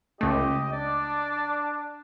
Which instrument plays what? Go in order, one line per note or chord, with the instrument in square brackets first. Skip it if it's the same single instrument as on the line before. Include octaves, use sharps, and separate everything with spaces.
[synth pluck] C#2 A3 [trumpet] G4 [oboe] D#5
[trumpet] D4 [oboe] D5